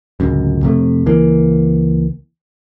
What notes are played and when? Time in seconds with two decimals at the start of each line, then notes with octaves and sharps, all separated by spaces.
0.20 D1 G#1 C#2 F#2
0.63 F2 C3 A3
1.06 C#2 E3 A#3